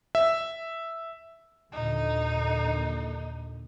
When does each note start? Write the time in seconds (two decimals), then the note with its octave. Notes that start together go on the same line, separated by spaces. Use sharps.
0.15 E5
1.73 D#2 A#2 D3 D#4